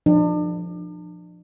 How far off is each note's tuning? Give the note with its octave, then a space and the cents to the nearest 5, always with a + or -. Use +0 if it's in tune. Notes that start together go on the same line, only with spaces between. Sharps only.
F3 +0 D4 +35